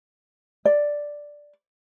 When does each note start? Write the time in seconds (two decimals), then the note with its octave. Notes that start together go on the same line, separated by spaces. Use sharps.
0.65 D5